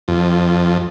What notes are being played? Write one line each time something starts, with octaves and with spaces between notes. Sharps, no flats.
F2